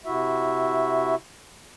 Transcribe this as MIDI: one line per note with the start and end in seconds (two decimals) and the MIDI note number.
0.05 1.15 48
0.05 1.15 64
0.05 1.15 66
0.05 1.15 76